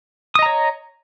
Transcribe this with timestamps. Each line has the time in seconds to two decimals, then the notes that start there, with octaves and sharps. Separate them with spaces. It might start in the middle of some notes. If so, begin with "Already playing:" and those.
0.35 D#6
0.39 D#5
0.42 A#5
0.46 C#5